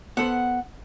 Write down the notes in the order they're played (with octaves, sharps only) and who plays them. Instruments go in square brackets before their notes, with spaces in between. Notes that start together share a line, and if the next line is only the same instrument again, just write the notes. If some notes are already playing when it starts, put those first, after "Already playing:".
[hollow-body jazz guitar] B3 A4 C5 [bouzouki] F#5